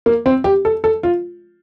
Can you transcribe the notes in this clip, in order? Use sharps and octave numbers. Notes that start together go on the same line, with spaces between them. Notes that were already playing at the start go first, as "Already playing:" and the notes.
A#3
C4
G4
A4
A4
F4